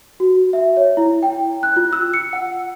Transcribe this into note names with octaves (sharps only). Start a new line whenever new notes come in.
F#4
E5
C#5
E4
G5
F#6
F4
E6
C#7
F#5